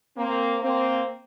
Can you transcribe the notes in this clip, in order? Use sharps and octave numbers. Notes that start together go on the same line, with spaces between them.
A#3 C4
A#3 C4